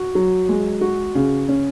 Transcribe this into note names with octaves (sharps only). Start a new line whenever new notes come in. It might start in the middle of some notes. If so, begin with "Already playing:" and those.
Already playing: F#4
F#3
G#3
F#4
C#3
C#4